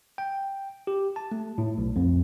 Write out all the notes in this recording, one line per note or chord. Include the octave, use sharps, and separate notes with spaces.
G5
G4
A5
A3
A2
B1
F2